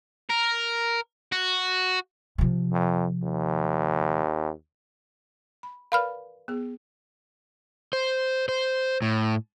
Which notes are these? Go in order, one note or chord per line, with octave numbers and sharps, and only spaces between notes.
A#4
F#4
C3 F3
F2
D#2
B5
A#4 B4 D5 F5 B5 F6
B3 G#4
C5
C5
A2